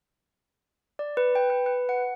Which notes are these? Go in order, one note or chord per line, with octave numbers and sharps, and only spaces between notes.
D5
B4
G5
B4
B4
F#5